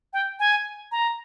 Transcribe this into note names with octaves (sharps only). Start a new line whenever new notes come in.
G5
G#5
A#5